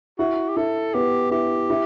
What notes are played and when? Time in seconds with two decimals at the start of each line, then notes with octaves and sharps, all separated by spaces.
0.18 E4 F#4
0.49 G4
0.57 E4 A4
0.94 B3 G4
1.31 E4 G4
1.70 E4